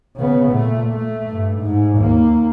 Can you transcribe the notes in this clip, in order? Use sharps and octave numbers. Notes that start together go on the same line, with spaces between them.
C#3 B3
A#2 A3
A3
G2
G#2
D#2 A#3